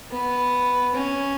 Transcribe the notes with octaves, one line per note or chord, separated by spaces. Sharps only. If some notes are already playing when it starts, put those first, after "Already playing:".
B3
C#4